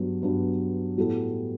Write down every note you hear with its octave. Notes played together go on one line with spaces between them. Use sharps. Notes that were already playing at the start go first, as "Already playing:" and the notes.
Already playing: G2 F#3 B3 D4
G2 F#3 B3 D4
A2 G3 B3 F#4 A4